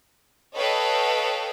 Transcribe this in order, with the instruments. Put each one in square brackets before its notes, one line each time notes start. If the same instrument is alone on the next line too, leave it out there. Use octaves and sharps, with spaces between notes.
[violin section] A4 B4 C#5 D#5 F5 G5